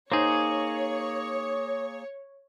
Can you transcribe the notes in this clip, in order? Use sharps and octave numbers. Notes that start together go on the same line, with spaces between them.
A#3 D#4 G#4 C5 C#5